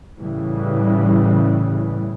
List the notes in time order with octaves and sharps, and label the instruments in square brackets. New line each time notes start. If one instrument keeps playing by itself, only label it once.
[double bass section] A2 C#3 E3 G3